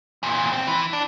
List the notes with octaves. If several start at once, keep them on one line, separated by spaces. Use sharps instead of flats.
E2 A#2
C4
E3
D4